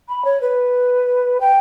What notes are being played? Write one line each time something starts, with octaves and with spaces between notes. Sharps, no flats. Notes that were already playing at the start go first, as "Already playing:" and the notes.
B5
C#5
B4
G5